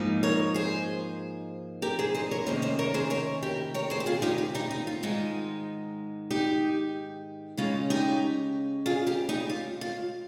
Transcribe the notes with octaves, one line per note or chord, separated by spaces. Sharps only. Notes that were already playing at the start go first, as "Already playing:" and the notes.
Already playing: G#2 F3 A#3 D#4
A#4 C#5
G#4 C5
G4 A#4
G#4 C5
C5 D#5
A#4 C#5
C3 D#3 A#3 C#4 C5 D#5
C5 D#5
A#4 C#5
G#4 C5
A#4 C#5
G4 A#4
A#4 C#5
G#4 C5
G4
F4 G#4
D#4 G4
F4
D#4 G4
D#4
F4
G#2 D#3 G#3 D#4
D#4 G4
C#3 G#3 C#4 F4
D#4 G4
F4 G#4
G4 A#4
D#4 G4
F4
F4